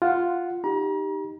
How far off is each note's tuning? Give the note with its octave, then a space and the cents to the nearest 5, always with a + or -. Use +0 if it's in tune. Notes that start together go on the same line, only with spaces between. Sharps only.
F4 +0 F#5 +0
D#4 +0 G4 +0 A#5 +40